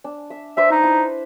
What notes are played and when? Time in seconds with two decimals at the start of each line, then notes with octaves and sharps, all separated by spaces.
0.04 D4
0.30 E5
0.57 D4 B4 C5 E5
0.71 D#4
0.83 E4